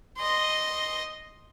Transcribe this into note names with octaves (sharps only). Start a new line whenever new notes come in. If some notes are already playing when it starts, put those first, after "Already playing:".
D#5 C6